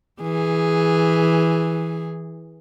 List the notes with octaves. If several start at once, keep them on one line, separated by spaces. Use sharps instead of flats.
E3 G#4